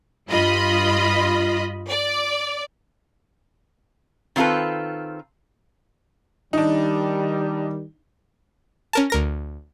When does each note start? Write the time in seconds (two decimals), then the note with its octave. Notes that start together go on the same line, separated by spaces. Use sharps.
0.28 G2 F4 D#5 B5
1.90 D5
4.36 D#3 C4 F4 A4 B4
6.53 D#3 G3 D4 D#4
8.93 C#4 A#4 A5
9.10 D2 A#4 A#6